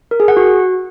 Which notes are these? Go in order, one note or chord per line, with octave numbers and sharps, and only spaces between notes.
A#4
G#4
F#5
F#4